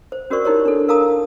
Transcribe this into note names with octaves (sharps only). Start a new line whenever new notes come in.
C5
C#4 F#4 A#4 C5 D5 C#6
D#4 E4 G4 A#4 C5 C#5
D4 A4
A#4 F5 A5 A#5 D#6